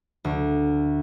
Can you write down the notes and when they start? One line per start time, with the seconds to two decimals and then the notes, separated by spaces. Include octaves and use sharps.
0.24 D2